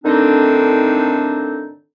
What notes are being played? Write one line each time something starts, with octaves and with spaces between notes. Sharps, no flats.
A2 D3 D#3 C4 D4 D#4